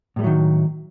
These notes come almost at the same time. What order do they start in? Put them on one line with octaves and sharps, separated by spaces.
A2 G3 A3 F#3 D#3